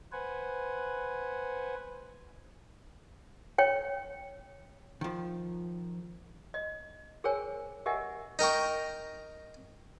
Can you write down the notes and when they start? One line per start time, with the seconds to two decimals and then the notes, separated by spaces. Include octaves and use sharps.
0.12 B4 C5 F#5 G#5
3.58 C#5 G5
5.01 D#3 F3
6.54 D#5
7.24 G#4 A#4 C5 C#5 G5 G#5
7.86 G4 A#4 D#5 E5 F#5 G#5
8.39 D#4 A#4 G5 C#6